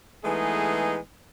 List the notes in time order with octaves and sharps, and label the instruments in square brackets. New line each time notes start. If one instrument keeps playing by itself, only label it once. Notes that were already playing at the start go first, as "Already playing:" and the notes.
[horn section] E3 G#3 A3 B3 D#4 G#4